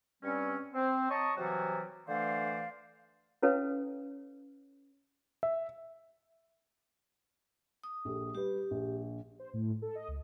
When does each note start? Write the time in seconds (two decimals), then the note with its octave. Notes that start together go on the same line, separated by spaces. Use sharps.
0.23 G2 G3 C4 C#4
0.74 C4 C5
1.10 C#5 D#5 A5 A#5 C#6 D#6
1.37 C3 E3 F#3 G3 F#4
2.08 D3 E3 A3 C5 D5 F5
3.42 C#4 E4 A4 B4 C#5 F5
5.43 E5
7.83 D#6
8.05 A#1 G4 A4
8.35 G3 G4 B4
8.71 A#1
9.39 C5
9.54 A2
9.82 A4
9.95 D#5
10.08 C#2